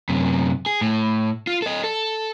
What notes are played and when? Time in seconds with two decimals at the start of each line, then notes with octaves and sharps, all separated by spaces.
0.09 F#2 C3
0.66 G#4
0.81 A2
1.47 F4
1.62 A4 D#5
1.84 A4